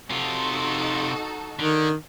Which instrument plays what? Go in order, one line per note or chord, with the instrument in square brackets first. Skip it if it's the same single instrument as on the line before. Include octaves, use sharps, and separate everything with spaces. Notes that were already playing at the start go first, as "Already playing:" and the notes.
[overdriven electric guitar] C3 F4 [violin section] D#4 F#4 A4
[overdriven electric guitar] D3 [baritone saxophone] D#3